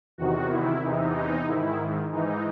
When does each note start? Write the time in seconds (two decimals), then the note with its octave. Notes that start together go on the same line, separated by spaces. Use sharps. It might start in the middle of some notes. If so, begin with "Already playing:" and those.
0.18 E2 C3 D#3 F#4
0.50 E4
0.83 E2 C3 E3 D#4
1.15 D#4
1.47 G#2 D#3 E4
2.12 G#2 E3 D#4